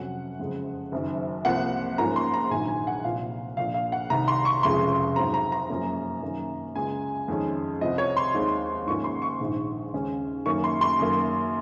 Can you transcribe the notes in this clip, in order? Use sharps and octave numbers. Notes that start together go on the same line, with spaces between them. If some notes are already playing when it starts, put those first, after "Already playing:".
Already playing: F2 C3 F#3 C#4 F#5
F#1 F2 C#3 G#3
F#1 F#2 D#3
C2 C3 F3 A#3 F#5
G#2 F3 A#3 C#4 A#5
C6
A#5
A#1 G#2 D#3 F#3 G#5
G#5
F#5
C2 A#2 F3 F5
A#1 A#2 F3 F5
F5
F#5
C2 C3 D#3 A#5
C6
C#6
F1 F2 C#3 F3 G#3 C6
G#2 F#3 C4 A#5
A#5
A#5
F#2 F3 A#3 C#4
F#2 D#3 A#3 C#4
C#2 C#3 G#3 G#5
F2 D#3 G#3 C#4
C2 C3 F3 D#5
C#5
C6
D#2 D#3 G#3 C4
G#2 F3 A#3 C#4 C#6
C6
C#6
A#1 G#2 D#3
D#2 C#3 G#3 C#4
F#2 D#3 A#3 C#4 C#6
C6
C6
F#2 D#3 A#3